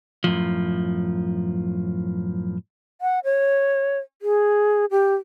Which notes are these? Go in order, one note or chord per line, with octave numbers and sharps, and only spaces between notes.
F#2 A2 F3
F#5
C#5
G#4
G4